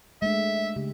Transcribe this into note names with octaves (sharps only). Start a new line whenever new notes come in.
G#3 A3 D4 E5
C#3 G4